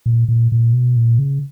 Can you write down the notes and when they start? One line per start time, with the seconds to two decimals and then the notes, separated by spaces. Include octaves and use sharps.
0.06 A#2
0.28 A#2
0.52 A#2
0.73 B2
0.96 A#2
1.19 C#3